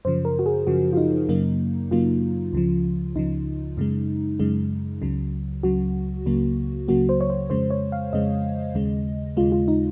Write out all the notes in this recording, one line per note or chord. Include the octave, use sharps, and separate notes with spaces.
F#2 C#3 F3 C5
A#4
F#4
G#4
F#2 C#3 F3 F#4
F4
D#4
F#2 C#3 F#3 A#3
F#2 C#3 F#3 A#3 F4
C#2 C#3 F3
C#2 C#3 F3 D#4
F#2 C#3 G#3
F#2 C#3 G#3
C#2 C#3 F#3
C#2 C#3 F#3 F#4
C#2 C#3 F#3 A#3
C#2 C#3 F#3 A#3 F#4
C5
C#5
C5
F2 C#3 G#3 C5
C#5
F5
F2 C#3 G#3 D#5
D#2 C#3 G#3
D#2 C#3 G#3 F4
F4
D#4